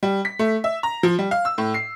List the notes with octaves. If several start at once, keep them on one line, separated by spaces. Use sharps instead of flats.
G3
B6
A3
E5
A#5
F3
G3
F5
E6
A2
C7